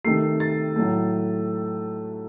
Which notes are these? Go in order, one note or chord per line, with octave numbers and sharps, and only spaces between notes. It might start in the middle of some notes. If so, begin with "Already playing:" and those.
C3 D#3 A3 C7
A6
A2 F#3 A3